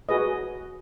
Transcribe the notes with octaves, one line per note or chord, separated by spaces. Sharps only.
F#4 G#4 B4 D#5